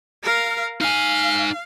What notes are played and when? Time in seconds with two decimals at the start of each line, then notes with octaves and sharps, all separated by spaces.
0.23 A#4 F5
0.81 D#4 F5 G#5